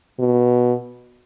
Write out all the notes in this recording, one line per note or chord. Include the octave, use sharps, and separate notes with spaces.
B2